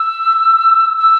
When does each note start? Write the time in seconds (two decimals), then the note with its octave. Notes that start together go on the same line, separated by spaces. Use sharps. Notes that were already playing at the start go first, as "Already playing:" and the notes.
Already playing: E6
0.97 E6